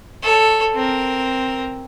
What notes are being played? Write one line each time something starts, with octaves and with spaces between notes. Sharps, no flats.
A4 C#5
C4 A#4